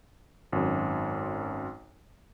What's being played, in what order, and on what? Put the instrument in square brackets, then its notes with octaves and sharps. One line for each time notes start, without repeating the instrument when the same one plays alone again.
[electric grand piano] G#1 F#2